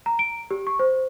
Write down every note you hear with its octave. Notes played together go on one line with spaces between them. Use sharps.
A#5
D7
G4
C#6
C5